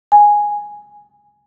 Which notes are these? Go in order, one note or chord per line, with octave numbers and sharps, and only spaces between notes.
G#5